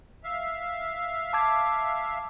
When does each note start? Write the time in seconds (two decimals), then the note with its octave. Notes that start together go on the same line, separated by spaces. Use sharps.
0.24 E5 F5
1.33 A5 D6 G#6